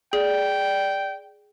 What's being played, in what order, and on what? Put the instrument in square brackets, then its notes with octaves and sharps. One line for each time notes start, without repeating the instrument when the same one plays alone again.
[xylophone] G#4 [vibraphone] D5 [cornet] G5